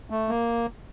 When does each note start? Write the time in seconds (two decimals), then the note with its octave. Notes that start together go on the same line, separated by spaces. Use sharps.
0.10 A3
0.29 A#3